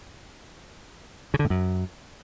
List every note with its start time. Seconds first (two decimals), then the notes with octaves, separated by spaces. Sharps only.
1.34 C#3
1.39 D3
1.45 A2
1.50 F#2